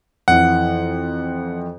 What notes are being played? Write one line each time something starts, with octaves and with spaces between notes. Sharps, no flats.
F2 E3 F#5